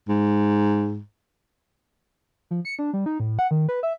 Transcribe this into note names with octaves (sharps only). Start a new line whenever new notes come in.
G#2
F3
C#7
D4
G3
D#4
A2
F#5
D#3
B4
E5